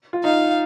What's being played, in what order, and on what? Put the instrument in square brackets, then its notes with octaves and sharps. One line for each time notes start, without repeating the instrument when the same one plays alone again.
[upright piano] F4
[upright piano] D#4 [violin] F5